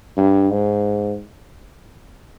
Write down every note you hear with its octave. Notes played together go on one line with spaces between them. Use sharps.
G2
G#2